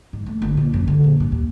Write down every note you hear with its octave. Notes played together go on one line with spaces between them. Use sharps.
G#2
A3
G1
A#2
F#2
D3
A#1
G2
D#2